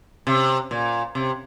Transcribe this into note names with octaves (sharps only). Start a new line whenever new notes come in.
C3
A#2
C3